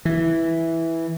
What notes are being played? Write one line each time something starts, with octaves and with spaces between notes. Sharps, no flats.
E3